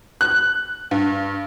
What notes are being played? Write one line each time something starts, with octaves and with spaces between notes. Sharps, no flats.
F#6
G2